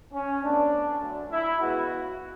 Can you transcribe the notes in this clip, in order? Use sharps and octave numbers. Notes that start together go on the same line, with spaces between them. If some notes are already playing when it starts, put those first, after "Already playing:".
C#4
A2 E3 B3 D4
D3 F#3 A3
E4
C#3 E3 G#3 B3 F#4